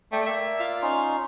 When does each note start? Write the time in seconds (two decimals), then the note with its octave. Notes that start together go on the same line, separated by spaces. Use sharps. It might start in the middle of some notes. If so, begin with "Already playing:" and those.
0.12 A3 D5 E5 G5
0.26 A#3 D5 E5
0.60 F4
0.82 C#4 D#4 C6